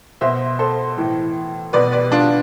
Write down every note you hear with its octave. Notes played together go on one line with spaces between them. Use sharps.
B2 C5 E5
A4 C5
A2 E3
B2 B4 D5
B4 D5
D4 F4